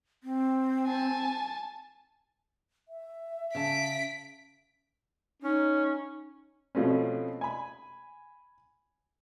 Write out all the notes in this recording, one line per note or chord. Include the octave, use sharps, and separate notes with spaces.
C4
G#5 A5
E5
C#3 A5 B6 D7
C#4 D#4
B2 F3 A3 C4 C#4
G#5 B5